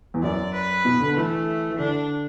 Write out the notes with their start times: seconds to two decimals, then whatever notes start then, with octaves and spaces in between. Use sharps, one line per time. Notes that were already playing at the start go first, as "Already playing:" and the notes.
0.14 E2
0.23 F#2 D5
0.54 B4
0.85 B2
1.00 D3
1.16 E3 A3
1.70 E3
1.78 D3 D4